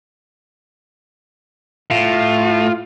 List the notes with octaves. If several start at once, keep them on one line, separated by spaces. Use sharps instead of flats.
A2 F4